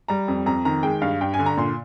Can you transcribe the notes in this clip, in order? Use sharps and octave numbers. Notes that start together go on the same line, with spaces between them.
G3 A#5
F2
F2 A#5
D#3 A#5
G#3 G5
G2 F5
G2 G5
G#5
D3
A#5
A#2 C6